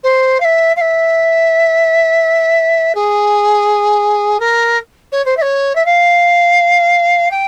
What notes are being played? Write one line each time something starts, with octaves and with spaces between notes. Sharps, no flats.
C5
F5
E5
F5
E5
G#4
A#4
C#5
C5
E5
C#5
E5
F5
G5